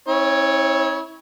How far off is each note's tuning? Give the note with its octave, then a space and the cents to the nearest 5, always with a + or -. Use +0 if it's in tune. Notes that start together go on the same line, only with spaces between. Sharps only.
C4 +40 E4 -35 C#5 +0